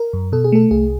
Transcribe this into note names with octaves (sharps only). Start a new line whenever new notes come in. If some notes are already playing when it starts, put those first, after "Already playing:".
Already playing: A#4
F#2
B2 A4
G#4
A3 A4
C2 G#4